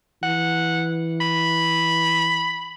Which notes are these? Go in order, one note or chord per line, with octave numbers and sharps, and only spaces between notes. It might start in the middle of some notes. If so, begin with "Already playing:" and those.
E3 F#5
B5